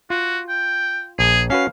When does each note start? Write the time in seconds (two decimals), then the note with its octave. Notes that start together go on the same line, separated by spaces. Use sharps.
0.10 F4 F#4
0.49 G5
1.19 A#1 G#4
1.50 C#4 F#4 B4 F5